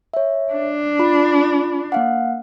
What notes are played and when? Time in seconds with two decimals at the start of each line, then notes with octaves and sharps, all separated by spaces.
0.14 C#5 E5
0.53 D4
0.99 F4 B5 C7
1.92 A#3 F5 F#5